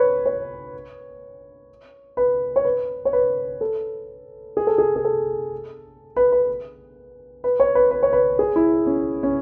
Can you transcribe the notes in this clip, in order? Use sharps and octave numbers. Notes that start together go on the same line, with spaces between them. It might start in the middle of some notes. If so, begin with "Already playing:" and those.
Already playing: B4 C#5
C#5
B4
C#5
B4
C#5
B4
A4
G#4
A4
G#4
G#4
A4
B4
B4
B4
C#5
B4
B4
C#5
B4
G#4
E4
C#4
C#4